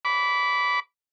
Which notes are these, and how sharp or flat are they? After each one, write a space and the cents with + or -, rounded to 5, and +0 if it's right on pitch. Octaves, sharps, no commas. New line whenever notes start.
B5 +0 D6 -25